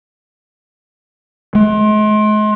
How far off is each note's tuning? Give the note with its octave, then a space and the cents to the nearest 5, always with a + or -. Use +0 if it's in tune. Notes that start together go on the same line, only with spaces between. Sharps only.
G#3 +40